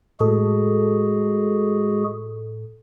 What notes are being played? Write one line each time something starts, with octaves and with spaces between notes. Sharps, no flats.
A2 G#3 F#4 G#4 A4